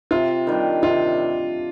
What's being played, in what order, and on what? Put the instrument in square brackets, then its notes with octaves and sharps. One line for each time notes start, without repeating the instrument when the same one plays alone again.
[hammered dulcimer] C3 [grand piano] F4
[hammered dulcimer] D#3 G3 D4
[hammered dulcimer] C3 [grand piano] F4